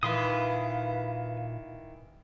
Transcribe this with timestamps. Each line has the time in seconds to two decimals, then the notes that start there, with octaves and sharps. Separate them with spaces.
0.03 A#2 D#3 E3 B4 F5 C6 D#6